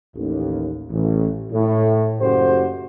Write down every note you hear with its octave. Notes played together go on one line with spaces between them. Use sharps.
A1 D#2
A1
A2
F#1 F#2 A3 F#4 G4 C5